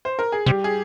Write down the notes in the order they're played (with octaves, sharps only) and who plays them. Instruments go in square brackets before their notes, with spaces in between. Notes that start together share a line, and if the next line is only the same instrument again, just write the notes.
[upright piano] C5
A#4
G#4
[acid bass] C3 [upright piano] G3 G4
[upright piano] G#4